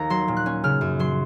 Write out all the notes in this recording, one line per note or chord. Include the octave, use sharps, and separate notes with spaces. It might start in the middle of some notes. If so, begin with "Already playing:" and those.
Already playing: D#2 A#5
F#3 C6
A#2
F#6
C#4
C#3 F6
F#2
F#3 C6